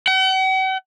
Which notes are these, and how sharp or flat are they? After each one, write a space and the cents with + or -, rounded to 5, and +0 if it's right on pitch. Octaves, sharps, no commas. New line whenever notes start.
F#5 +45